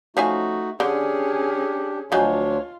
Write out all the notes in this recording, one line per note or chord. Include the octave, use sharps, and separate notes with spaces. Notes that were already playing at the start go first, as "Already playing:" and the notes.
F3 A3 C#4 D#4 F#4 G#5
D3 C#4 D4 G4 G#4
D2 F3 F#3 D4 F4 C#5 D#5 G#5